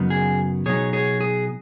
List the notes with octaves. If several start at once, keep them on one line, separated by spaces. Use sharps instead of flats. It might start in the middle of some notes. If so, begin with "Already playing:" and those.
Already playing: F#2 C#3 F#3 B3 D#4
G#4
B2 F#3 B3 D#4 G#4 C#5
G#4 C#5
G#4